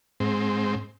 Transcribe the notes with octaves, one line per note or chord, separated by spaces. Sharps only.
G#2 C4